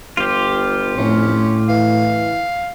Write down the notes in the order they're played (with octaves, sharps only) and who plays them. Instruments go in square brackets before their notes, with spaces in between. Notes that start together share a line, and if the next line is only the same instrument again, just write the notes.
[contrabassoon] G1 [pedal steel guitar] F4 G4
[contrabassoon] F1 [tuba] A2 [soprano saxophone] C#4
[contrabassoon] E3 [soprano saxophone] F5